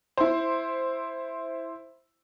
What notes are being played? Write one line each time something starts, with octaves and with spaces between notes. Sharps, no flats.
E4 C5